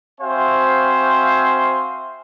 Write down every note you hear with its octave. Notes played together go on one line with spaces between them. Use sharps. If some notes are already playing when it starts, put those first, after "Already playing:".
C4 F#4 C5 E5 F5 G#5